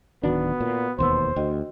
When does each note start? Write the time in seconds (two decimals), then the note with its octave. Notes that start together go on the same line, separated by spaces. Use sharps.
0.23 D1 D#3 B3 D4 F#4
0.60 A#2
0.99 E1 D#2 B3 C5 C6 E6
1.36 D2 F#4 D#5 G5